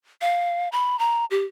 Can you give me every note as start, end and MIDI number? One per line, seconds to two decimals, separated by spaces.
0.21 0.69 77
0.72 0.99 83
0.99 1.25 82
1.31 1.45 67